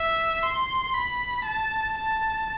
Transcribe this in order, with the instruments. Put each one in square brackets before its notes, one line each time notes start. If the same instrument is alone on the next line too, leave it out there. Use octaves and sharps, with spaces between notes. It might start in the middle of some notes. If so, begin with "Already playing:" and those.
Already playing: [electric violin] E5
C6
B5
A5
A5